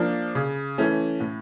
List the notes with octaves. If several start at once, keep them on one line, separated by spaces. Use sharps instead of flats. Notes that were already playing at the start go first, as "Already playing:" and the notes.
Already playing: F3 A#3 D4
C#3
E3 A3 C#4
A2